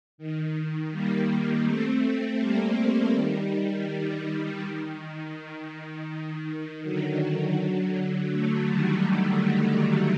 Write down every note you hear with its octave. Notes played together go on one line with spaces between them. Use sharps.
D#3
G3 A#3
A3 C4
G3 A#3
D#3 G3
D#3
D#3
D3 F#3
F#3 A3
D#3 G3